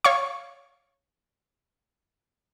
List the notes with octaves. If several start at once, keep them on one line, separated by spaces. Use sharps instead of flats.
C#5 F5 C#6